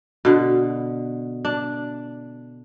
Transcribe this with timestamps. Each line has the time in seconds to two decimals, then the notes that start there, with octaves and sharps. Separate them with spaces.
0.25 B2 D3
1.45 D4